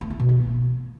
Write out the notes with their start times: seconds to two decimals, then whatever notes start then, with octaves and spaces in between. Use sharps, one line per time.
0.01 A3
0.10 E4
0.20 B2
0.29 A#3
0.38 A3